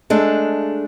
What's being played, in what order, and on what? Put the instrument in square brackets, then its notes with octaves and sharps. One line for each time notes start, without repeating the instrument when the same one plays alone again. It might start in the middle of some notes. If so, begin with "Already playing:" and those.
[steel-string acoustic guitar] G#3 A3 D4